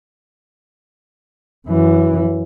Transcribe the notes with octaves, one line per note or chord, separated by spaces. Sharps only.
F#2 E3